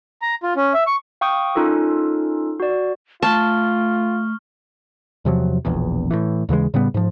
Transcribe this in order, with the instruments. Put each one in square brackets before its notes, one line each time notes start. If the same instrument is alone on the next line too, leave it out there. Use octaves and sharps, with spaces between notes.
[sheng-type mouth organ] A#5
F4
C#4
E5
C#6
[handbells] F5 G5 C#6 D#6 G6
C#4 D#4 F4 A4 A#4
F#4 D5
[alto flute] A3 [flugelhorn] F4 [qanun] A5 [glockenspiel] C#6 F6 G7
[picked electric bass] E2 C3 F3 F#3
E1 A#1 E2
A2 E3
D#2 C#3 E3 G#3
A2 C#3 G3 B3
G#2 F3